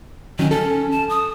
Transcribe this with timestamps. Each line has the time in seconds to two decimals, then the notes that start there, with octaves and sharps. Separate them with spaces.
0.39 D#3 F#3 C#4
0.51 C#4 A4
0.91 A5
1.09 D#6